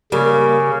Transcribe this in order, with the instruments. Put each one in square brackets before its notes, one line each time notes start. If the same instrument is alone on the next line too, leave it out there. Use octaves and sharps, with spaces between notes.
[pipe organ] C#3 [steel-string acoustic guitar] G3 A#3